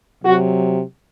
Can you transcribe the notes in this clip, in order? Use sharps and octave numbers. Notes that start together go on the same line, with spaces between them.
C3 F#3 F#4